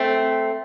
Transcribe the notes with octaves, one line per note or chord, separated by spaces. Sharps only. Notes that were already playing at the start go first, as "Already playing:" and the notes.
Already playing: A3 C4